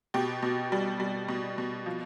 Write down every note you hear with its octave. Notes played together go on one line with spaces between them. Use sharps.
B2 G4
B2
G3
G3
B2
B2
F3